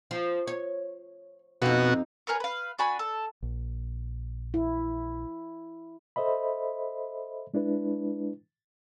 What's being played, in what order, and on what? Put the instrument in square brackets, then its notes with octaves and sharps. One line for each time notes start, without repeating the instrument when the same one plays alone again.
[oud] F3
C#5
[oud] F2 D#4 [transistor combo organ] B2 F#4
[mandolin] G#4 A#4 B4 C#5
B4 F5
D4 F#4 G#5 B5
A4
[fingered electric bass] A#1
[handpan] E4
[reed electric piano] A4 C5 D#5 E5 B5
G#3 D4 E4 B4